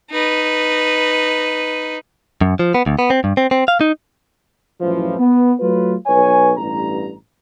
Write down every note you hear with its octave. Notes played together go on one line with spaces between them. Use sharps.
D#4 B4
F#2
F3
B3
D2
B3
C4
G2
C4
C4
F5
D#4
F#2 A2 E3 F3
B3
F#3 A3 F4 B4
B1 B4 C#5 G#5
A1 G2 A#5